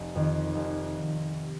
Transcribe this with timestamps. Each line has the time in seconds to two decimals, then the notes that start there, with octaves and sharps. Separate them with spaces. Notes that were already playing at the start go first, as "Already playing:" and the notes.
Already playing: F1
0.15 F2 D#3
0.55 F1